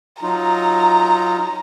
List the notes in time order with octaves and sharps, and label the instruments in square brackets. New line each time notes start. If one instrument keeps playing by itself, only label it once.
[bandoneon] F#3 D#4 F4 [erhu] A#5